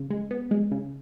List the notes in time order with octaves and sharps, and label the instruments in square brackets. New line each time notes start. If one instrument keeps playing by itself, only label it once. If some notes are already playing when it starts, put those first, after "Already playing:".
Already playing: [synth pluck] C#3
G#3
B3
G#3
C#3